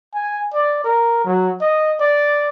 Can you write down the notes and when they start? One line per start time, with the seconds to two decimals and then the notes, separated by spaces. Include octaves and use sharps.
0.14 G#5
0.53 D5
0.84 A#4
1.25 F#3
1.61 D#5
2.00 D5